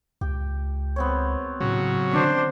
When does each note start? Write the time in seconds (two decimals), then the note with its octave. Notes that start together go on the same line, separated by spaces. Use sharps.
0.21 C#2 G4
0.96 B3 C4 C#5
1.60 A2 C#3 F#3
2.13 D3 D4 C5